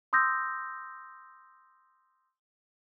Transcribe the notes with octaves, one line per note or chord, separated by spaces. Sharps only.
C6 D#6 E6 G6 A#6